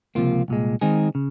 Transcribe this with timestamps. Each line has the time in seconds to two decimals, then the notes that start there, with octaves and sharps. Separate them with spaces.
0.15 C#2 C3 F3 A#3 F4
0.48 C2 A#2 G#3
0.81 D#3 G#3 C4 D#4 G#4
1.15 C#3